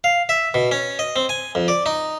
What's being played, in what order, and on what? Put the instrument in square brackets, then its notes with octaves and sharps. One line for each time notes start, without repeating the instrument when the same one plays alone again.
[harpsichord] F5
E5
B2
C#4
D#5
C4
G#5
F2
D5
D#4